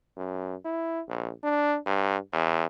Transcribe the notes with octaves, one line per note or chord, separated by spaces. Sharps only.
F#2
E4
A#1
D4
G2
E2